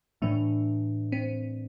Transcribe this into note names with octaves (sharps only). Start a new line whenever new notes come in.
A2 E3 A3 D4
C4